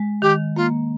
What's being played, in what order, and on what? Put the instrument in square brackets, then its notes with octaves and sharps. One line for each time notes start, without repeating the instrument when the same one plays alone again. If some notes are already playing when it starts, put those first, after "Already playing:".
Already playing: [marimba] G#3
[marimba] D#3 [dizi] G4
[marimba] A#3 [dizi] F4